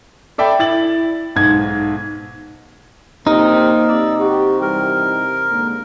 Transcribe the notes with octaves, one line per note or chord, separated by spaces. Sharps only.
A4 D5 E5 G5 B5
E4 A6 F#7
B1 G#2 G#6
C3 F3 A#3 D#4 A#4
C3 D5 E6
F#4 G4
E3 G3 A#4
G#2 D3 A#3